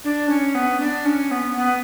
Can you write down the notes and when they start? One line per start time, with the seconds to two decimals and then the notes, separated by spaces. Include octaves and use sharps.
0.04 D4
0.29 C#4
0.55 B3
0.80 D4
1.06 C#4
1.31 B3
1.56 B3